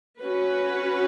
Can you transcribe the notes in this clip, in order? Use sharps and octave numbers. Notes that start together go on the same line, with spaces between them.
C#4 F#4 B4